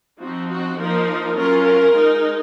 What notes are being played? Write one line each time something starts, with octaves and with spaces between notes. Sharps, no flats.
F3 C4 D#4 F#4
F#4
F3 A#3 D#4 A#4
F#3 C#4 F4 A#4
A#4
G#3 D#4